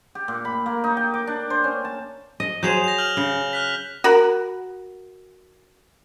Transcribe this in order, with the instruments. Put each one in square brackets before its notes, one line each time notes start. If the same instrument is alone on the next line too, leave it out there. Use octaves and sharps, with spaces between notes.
[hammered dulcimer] G4
A#2
B5
A#3
D#4
G5
D6
D4
C5
C#4
A5
[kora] D#5
[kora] F#3 G#4 C5 [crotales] G6 E7 F7
[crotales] A#6 F7
F6 G6 F#7
[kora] C#3
[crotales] F6 F#6 B6
[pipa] F#4 A#4 B5